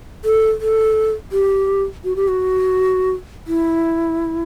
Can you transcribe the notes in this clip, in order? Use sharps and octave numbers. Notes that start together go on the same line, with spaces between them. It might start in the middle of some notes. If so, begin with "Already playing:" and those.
A4
A4
G4
F#4
G4
F#4
E4